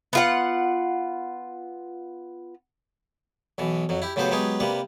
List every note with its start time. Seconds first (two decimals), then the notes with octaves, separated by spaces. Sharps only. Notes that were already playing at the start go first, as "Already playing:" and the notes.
0.13 B3 F4 F#5
3.58 B1 B2 E3
3.89 F2 F#3
4.02 E4 G4
4.16 A2 C#3 F#3 B3 G4 C5
4.32 F#3 G#3 B3 G4 G#4
4.60 C3 G3 A#3 B4